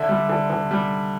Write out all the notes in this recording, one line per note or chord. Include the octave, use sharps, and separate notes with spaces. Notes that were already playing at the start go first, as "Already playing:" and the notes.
Already playing: D3 E5
G3
D3
D3
G3